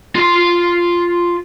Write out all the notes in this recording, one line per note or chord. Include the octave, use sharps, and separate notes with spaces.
F4 C6